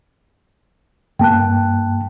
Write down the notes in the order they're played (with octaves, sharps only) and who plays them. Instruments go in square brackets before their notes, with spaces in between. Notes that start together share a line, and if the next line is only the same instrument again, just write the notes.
[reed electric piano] G2 A#3 [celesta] G5 A5 F#6